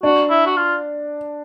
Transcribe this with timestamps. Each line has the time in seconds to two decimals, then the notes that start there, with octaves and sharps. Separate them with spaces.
0.03 D4 F#4
0.30 E4
0.46 F#4
0.56 F4